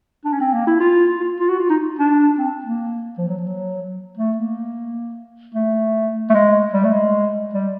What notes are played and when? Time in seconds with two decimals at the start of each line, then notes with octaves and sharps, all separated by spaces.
0.25 D4
0.33 C#4
0.41 C4
0.53 A#3
0.67 E4
0.80 F4
1.20 F4
1.40 F4
1.49 F#4
1.60 F4
1.70 D#4
1.99 D4
2.38 C4
2.64 A#3
3.18 F3
3.28 F#3
3.38 F3
3.47 F#3
4.17 A3
4.36 A#3
5.54 A3
6.30 A3
6.34 G#3
6.73 G3
6.84 A3
6.93 G#3
7.53 G3